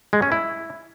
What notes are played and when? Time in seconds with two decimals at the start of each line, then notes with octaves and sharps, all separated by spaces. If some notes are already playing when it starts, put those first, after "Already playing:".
0.13 G#3
0.22 C#4
0.32 E4